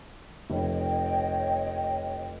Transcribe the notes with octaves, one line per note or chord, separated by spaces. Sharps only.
F1 C#5 D#5 G5